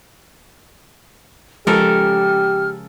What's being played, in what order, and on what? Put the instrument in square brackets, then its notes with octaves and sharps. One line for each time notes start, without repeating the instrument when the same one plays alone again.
[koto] C#3 A4 A#4 [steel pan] F3 G#3 [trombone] G4 [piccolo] F6